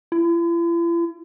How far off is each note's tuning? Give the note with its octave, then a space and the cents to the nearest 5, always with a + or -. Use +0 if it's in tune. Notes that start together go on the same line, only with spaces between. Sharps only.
E4 +45